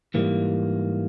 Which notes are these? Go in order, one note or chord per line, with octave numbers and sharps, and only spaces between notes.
G#2 E3 G3 A#3